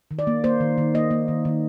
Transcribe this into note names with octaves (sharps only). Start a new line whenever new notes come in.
D#3
D5
A#3
A#3 C5
D#3
D#3
A#3 D#5
A#3
D#3
D#3